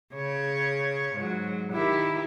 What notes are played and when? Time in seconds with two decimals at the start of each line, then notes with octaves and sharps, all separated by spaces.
0.14 C#3 C#5
1.15 G#2 F#3
1.71 D#3 E4 G4